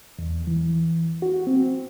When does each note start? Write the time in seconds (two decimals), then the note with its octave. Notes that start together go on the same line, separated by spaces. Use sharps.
0.19 E2
0.47 E3
1.22 F#4
1.47 C4